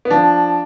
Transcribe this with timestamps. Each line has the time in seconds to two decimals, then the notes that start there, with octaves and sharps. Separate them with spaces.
0.05 B3
0.10 F3 D4